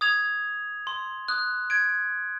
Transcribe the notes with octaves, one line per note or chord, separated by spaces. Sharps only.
D#6 G#6 F7
C6
D#6 F#6
G#6 D7